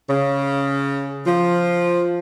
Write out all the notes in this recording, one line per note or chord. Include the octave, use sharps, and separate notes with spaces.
C#3
F3